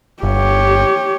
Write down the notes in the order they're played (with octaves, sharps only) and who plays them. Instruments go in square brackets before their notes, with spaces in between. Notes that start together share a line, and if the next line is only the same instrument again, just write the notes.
[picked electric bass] G1 [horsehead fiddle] G4 C#5